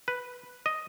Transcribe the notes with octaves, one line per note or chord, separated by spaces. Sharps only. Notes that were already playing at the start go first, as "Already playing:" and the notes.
B4
D#5